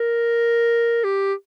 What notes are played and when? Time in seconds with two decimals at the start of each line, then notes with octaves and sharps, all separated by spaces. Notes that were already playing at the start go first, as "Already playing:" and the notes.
Already playing: A#4
1.04 G4